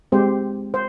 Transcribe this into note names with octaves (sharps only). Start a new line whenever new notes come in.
G#3 C4 G4 C5
C5